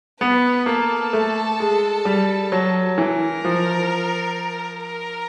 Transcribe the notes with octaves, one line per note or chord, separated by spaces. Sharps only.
B3 B4
A#3 A4
A3
G#3
G3
F#3
E3 A#4
F3
A#4